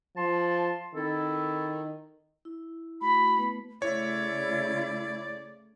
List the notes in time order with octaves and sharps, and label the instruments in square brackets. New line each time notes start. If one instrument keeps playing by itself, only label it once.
[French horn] F3 [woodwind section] A5 C6
[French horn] D#3 [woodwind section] C4 E4 A4
[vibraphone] E4
[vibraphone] A3 E4 F#4 [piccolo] B5
[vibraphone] A3 B3 B4
[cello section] C#3 A3 [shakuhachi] E4 [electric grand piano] C#5 [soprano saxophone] D5